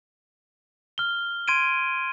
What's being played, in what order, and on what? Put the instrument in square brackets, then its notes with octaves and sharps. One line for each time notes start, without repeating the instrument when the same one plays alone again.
[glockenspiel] F6 G7
C6 G#6 D7 D#7